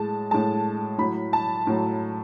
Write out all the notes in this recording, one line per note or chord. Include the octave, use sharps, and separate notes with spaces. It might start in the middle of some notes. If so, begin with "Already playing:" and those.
Already playing: A2 G#3 A5
A2 G#3 A5
A2 F#3 B5
A5
A2 F#3